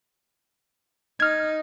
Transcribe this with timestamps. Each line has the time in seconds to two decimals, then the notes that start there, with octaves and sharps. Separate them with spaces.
1.20 D#4 F6 G#6